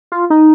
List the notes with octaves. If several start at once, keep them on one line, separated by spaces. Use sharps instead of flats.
F4
D#4